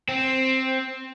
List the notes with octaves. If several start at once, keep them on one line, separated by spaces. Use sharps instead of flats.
C4